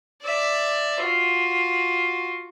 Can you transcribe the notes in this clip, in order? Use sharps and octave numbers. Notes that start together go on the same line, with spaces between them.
D5 E5
F4 F#4